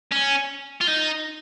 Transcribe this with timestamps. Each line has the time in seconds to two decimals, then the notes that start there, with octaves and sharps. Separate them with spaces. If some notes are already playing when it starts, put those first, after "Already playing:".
0.12 C#4
0.81 F4
0.88 D#4